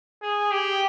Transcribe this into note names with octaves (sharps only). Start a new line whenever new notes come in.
G#4
G4